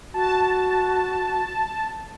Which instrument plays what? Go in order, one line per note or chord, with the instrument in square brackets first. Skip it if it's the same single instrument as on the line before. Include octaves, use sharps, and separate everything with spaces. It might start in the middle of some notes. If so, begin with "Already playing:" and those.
[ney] F#4 [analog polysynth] A5